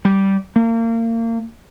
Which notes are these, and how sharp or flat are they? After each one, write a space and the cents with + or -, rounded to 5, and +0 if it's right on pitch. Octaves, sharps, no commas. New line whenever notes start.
G3 -10
A#3 -30